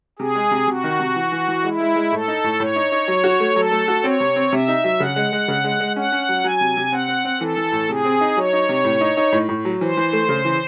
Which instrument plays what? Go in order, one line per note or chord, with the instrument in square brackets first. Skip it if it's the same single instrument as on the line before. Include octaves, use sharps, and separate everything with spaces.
[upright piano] C3 [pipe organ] G#4
[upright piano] G#3
C3
[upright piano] C3 [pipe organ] F#4
[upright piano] D#3
C3
E3
E3
E3
[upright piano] G#3 [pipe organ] E4
[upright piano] G#3
G#3
[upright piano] A2 [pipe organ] A4
[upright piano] D#4
A2
[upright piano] A2 [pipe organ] C#5
[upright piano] D#4
D#4
F#3
F#4
A3
[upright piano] F#3 [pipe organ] A4
[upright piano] A3
F#4
[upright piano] C4 [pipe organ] C#5
[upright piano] C3
C4
[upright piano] C3 [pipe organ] E5
[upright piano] D#4
F#3
[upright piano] C#3 [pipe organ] F#5
[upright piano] G#3
G#3
C#3
G#3
G#3
[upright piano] C#4 [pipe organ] F#5
[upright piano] C#4
F#3
[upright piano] F#3 [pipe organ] G#5
[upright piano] C3
C3
[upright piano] C4 [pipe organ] F#5
[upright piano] C4
C4
[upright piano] E3 [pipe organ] A4
[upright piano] E3
A2
[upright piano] C3 [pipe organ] G#4
[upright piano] C4
D#4
[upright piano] F#3 [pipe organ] C#5
[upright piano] D#4
C3
A2
D#4
D#4
A2
A2
F#3
[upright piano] E3 [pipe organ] C5
[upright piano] E3
A3
C#3
E3